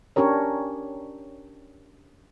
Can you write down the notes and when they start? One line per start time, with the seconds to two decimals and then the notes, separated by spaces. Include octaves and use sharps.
0.16 C#4 D4 G4 A#4 C#5